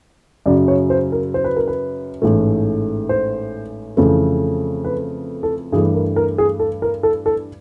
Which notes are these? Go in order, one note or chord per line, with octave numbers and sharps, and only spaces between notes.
F#2 C#3 F#3 D5
C#5
C5
A#4
C5
B4
A#4
B4
A1 G#2 E3 A3
C5
F2 C#3 E3 A3
B4
A4
G2 E3 A3 G#4
A#4
A#4
G#4
A4
A#4
A4
A4